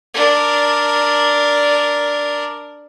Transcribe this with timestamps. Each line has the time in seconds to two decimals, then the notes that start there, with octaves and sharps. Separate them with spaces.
0.14 D4 A#4